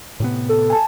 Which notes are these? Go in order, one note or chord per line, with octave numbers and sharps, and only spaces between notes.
A2 C3 B3
A4
G#5 A5